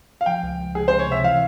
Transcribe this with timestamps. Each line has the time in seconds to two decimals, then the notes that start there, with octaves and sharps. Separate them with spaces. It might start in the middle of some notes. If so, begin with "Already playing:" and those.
0.21 F5
0.26 F3 G5
0.43 C#2
0.59 C#2
0.75 C#2 G#4
0.88 C#2 C5
0.99 C#5
1.07 C3 E5
1.23 E3 F5